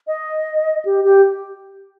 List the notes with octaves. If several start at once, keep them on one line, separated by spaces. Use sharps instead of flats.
D#5
G4
G4